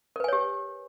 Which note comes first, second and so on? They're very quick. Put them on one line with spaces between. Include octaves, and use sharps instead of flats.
A#4 B4 G#5 C#5 G4